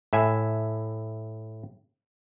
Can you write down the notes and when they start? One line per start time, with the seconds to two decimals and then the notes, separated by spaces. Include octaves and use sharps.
0.13 A2 E5 G#5